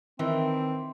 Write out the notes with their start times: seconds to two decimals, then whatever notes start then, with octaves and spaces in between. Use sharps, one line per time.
0.19 D#3 E3 C4